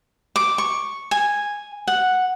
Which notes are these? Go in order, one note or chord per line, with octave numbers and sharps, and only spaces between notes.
D6
C#6
G#5
F#5